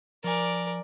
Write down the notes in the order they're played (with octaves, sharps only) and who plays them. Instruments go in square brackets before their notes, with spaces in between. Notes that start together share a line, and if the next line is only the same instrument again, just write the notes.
[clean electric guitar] F3 G#5 [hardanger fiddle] A#4 D5